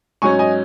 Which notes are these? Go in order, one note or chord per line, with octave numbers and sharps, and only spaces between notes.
G#2 F#3 C#4 G#5 C#6
D#5 G#5